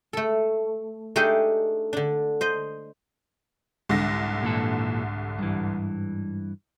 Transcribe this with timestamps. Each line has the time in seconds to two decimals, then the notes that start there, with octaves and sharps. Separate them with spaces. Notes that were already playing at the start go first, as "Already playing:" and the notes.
0.13 A3 A4
1.16 A3 D4 D#4 G4 G#4 D#5
1.93 D3 D4
2.41 C5 D#5
3.89 C2 G#2 D3 A#6
4.43 A#2 E3 A4
5.39 G2 E3